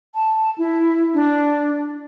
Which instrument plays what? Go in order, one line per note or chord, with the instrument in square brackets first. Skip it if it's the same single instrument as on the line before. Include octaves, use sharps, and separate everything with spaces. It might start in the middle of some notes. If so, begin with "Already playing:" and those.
[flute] A5
E4
D4